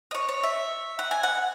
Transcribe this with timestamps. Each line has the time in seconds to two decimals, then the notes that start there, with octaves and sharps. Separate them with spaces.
0.11 D#5
0.15 C#5
0.29 C#5
0.43 E5
0.99 F#5
1.11 G#5
1.23 F#5